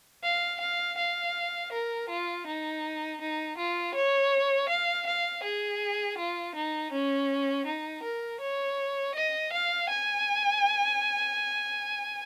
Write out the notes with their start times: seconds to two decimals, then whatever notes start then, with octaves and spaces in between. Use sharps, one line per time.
0.23 F5
0.60 F5
0.98 F5
1.73 A#4
2.09 F4
2.47 D#4
3.21 D#4
3.58 F4
3.95 C#5
4.69 F5
5.07 F5
5.43 G#4
6.18 F4
6.55 D#4
6.92 C#4
7.66 D#4
8.03 A#4
8.40 C#5
9.15 D#5
9.53 F5
9.89 G#5